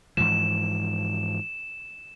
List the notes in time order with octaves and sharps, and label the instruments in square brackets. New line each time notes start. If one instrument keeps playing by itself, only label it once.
[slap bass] G#2 E3 F3 [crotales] E7